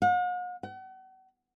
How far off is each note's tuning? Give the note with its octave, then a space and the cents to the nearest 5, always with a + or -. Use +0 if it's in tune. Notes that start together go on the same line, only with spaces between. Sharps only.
F#5 -45
F#5 +40